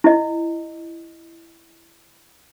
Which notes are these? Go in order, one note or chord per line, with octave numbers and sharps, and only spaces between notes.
E4 D#5